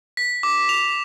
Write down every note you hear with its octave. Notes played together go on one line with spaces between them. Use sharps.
B6
D6
F7